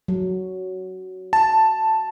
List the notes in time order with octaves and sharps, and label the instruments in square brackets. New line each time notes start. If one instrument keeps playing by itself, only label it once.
[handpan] F#3
[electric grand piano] A5